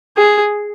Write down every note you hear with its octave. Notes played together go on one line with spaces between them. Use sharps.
G#4